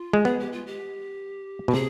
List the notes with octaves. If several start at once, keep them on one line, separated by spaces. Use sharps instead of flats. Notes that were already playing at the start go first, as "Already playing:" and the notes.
Already playing: F4
G#3
B3 G#4
G4
F4
G4
B2 B4
C3 G#4